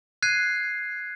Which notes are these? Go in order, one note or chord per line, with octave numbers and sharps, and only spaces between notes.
F#6 G#6 C7 D#7